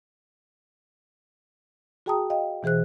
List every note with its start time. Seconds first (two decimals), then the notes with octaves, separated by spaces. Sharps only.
2.06 F#4 G#4 G5 A5 A#5 D#6
2.30 D#5 F5 G5
2.63 B2 E3 G#4 C5 F#6